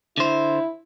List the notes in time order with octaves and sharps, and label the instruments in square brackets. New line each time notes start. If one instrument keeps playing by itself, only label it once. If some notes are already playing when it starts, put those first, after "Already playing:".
[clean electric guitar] D3 C5 [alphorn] E4